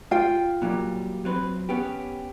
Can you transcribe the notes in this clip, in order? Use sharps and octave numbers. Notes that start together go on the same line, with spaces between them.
F4 G5
A#2 F#3 G3
F#3 C4 B4
B3 C#4 G4